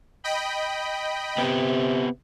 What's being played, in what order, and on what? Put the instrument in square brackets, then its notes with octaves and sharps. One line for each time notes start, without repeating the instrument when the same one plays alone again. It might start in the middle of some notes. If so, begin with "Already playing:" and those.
[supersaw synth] D#5 G5 B5
[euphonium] C3 [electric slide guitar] B3 G4